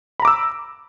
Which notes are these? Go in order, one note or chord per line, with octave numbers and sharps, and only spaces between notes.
A#5 B5 D6 E6